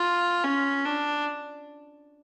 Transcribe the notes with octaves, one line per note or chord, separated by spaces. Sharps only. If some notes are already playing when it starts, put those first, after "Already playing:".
Already playing: F4
C#4
D4